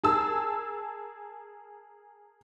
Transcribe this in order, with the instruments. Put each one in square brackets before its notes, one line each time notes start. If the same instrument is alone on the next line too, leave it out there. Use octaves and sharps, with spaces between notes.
[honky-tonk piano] G#4 A#4 A5 E6